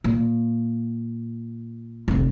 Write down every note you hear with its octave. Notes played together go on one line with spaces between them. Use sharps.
A#2
F1 D2